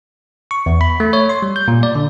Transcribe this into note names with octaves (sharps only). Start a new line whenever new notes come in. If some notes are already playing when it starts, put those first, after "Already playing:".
C#6
E2
B5
A3
C#5
C6
G3
G6
A#2
D5
D3